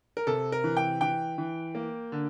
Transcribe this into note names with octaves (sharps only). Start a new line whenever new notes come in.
A#4
C3 A4
A#4
E3
G5
E3 G5
E3
A#3
D3